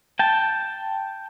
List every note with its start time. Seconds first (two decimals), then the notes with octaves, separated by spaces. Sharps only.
0.19 G5 A5